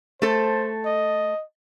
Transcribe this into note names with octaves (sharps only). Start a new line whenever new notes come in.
A3 A4 C5
D#5